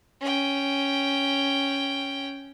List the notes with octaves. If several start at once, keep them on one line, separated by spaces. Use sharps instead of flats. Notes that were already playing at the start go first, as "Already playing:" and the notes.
C#4 G5